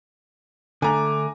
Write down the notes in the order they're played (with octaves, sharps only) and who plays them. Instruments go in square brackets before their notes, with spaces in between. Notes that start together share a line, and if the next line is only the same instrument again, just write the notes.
[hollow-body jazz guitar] D3 A3 [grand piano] G#5 A#5 [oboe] D6